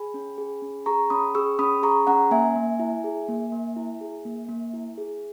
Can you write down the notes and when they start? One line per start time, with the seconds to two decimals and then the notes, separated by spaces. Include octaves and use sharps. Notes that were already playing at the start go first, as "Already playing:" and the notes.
Already playing: G#4 G#5 B5
0.14 C#4
0.38 G#4
0.62 C#4
0.86 G#4 A#5 C#6
1.10 C#4 B5 D#6
1.35 G#4 C#6 E6
1.59 C#4 B5 D#6
1.83 G#4 A#5 C#6
2.07 C#4 F#5 A#5
2.31 A#3 E5 G#5
2.56 A#3
2.79 E4
3.04 G#4
3.28 A#3
3.52 A#3
3.77 E4
4.01 G#4
4.25 A#3
4.49 A#3
4.73 E4
4.97 G#4